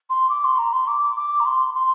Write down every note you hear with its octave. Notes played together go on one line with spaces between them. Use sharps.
C6
D6
C6
A#5
C6
D6
D6
A#5
C6
C6